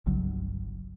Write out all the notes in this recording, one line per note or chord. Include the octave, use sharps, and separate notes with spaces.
G1 C2 C#3 F#3